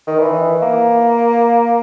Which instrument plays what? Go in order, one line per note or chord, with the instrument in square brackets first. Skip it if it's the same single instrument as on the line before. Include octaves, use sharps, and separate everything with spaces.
[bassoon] D#3
E3
A#3